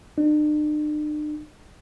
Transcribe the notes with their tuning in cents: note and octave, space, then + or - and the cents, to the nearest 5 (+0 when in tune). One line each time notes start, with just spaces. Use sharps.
D4 +45